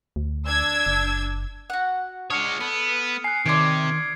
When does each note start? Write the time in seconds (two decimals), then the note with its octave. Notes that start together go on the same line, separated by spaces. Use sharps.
0.16 D2
0.46 D4 E6 G#6
0.86 F#1
1.70 F#4 F#5
2.30 G#3 D4 C#5 D#6 F6 C#7
2.60 B3 A4
3.24 G#5 F#6 C7
3.46 C3 D#3 C#5 D5 C6 G#6 D7